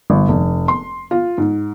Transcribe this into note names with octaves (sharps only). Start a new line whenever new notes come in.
G1
F1
C6
F4
G#2